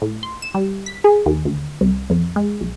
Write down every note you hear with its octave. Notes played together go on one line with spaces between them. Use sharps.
A2
C6
E7
G3
B6
G#4
D#2
D2
C2
F2
G#3
B1